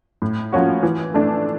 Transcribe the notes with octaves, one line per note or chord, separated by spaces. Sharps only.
A2
F3 A#3 C#4 F#4
E3
A3 D4